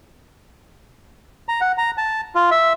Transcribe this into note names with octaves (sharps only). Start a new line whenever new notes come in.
A#5
F#5
A#5
A5
F4
E5